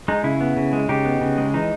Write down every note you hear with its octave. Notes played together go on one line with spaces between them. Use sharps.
G#3 D#4
C#3 E4
B3
C#3
G#3
C#3 D#4 G4
B3
C#3
G#3
E3 D#4